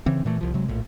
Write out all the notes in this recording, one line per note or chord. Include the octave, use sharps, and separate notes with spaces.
C#3 E3 C4
A#2 E3 A3
C2 F3
C3 F#3 G#3
A#1 A2